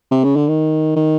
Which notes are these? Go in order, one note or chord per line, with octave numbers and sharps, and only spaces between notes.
C3
C#3
D3
D#3
D#3